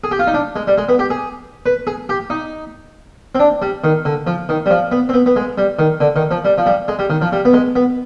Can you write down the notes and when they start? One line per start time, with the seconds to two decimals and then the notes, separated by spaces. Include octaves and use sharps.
0.04 G#4
0.11 G4
0.19 F4
0.27 D#4
0.34 D4
0.56 G#3
0.67 G3
0.78 G#3
0.89 B3
0.99 G4
1.10 G#4
1.66 B4
1.87 G#4
2.09 G4
2.30 D#4
3.35 C4
3.40 D4
3.62 G3
3.84 D#3
4.05 D3
4.27 F3
4.49 D#3
4.66 G3
4.70 F3
4.92 B3
5.09 C4
5.14 B3
5.26 B3
5.36 G#3
5.58 G3
5.79 D#3
6.00 D3
6.16 D#3
6.31 F3
6.45 G3
6.58 F3
6.66 G3
6.88 G#3
6.99 G3
7.10 D#3
7.22 F3
7.32 G3
7.45 B3
7.54 G#3
7.76 B3